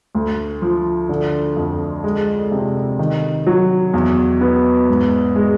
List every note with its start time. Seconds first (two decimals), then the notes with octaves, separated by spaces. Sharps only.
0.15 D2
0.62 F3
1.09 D3
1.56 F2
2.04 G#3
2.51 C3
2.99 D#3
3.46 F#3
3.94 E2
4.41 B3
4.88 G#2
5.36 G#3